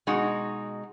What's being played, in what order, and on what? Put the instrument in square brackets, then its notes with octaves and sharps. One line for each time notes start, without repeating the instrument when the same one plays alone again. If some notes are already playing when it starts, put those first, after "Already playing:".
[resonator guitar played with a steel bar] B2 G#3 D#4 F#4